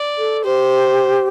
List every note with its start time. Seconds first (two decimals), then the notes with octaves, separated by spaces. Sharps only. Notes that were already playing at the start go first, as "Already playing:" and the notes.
Already playing: D5
0.18 A4
0.44 G4 C5